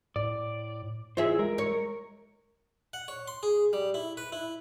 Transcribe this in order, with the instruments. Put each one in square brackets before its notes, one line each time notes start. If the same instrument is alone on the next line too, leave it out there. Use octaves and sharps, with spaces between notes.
[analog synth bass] A2 [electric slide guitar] D5
[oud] E3 E5 [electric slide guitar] E4 G#4 C5 [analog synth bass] F4
[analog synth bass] G#3 [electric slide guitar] A#4
[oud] C#5
[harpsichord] F#5
C#5
C6
G#4
G3
E4
B4
E4